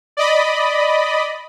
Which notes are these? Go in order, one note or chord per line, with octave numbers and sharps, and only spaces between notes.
D5 D#5 B5